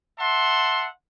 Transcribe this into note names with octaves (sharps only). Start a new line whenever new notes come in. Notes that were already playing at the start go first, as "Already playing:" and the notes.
E5 F#5 A5 C6